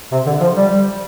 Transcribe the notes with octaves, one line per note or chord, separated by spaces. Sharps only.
C3
D3
F3
G3